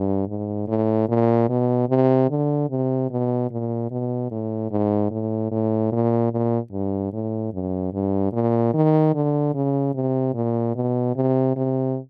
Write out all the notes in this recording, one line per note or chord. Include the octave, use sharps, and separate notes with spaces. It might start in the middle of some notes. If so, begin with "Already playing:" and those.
Already playing: G2
G#2
A2
A#2
B2
C3
D3
C3
B2
A#2
B2
A2
G#2
A2
A2
A#2
A#2
G2
A2
F#2
G2
A#2
D#3
D3
C#3
C3
A#2
B2
C3
C3